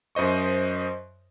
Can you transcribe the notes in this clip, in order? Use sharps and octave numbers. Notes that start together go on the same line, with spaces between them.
F#2 C5 D#5 C#6